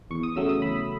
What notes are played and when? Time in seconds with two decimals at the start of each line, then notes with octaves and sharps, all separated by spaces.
0.11 E2 C#6
0.23 D#6
0.36 C#3 F#3 A3 E6
0.49 D#6
0.62 E2 B5